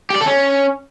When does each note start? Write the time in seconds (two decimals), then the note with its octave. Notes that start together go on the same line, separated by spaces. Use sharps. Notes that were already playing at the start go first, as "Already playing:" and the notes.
0.10 G4
0.16 D5
0.21 A4
0.26 C#4